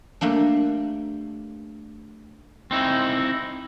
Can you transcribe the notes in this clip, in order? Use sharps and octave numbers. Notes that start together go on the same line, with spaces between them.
G3 A3 A#3 D4
C4 D#4 E4